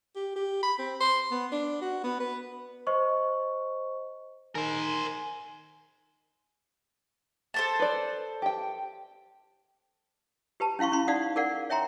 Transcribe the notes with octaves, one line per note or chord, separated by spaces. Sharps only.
G4
G4
B5
C4
C6
B3
D4
F#4
B3
B4
C5 D#5 C#6
D#3 A#4 C5 G#5
A4 C5 A5
B4 D5
G4 G5
G4 B4 A5
C#4 E4 F5 C6 C#6
C#4 B5 C6
D#4 D5 F5 F#5 D#6
G#4 A#4 D5 F5 F#5
C#5 E5 G5 A#5 C6